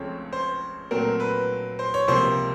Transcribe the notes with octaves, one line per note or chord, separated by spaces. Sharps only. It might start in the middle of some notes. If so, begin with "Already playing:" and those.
Already playing: C#2 C#3 F3 A3 C4 C#5
C5
A#2 F#3 A3 C4 A#4
B4
C5
C#5
C#2 C3 F3 A#3 C5